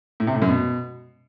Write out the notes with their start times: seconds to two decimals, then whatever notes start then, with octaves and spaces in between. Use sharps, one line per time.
0.20 A2
0.27 C3
0.34 A2
0.42 F#2
0.49 B2